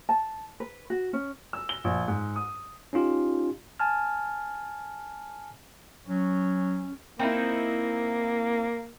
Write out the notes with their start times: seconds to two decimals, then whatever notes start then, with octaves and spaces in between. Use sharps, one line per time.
0.09 A5
0.60 B4
0.90 F#4
1.13 C#4
1.53 E6
1.69 G7
1.84 A#1
2.08 G#2
2.36 D#6
2.93 C#4 D#4 F4 G4
3.80 G#5 A5 F6
6.07 F#3 C#4
7.19 A#3 C4 D#4 E4